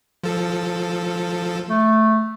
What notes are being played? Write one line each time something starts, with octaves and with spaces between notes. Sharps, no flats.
F3 A4
A3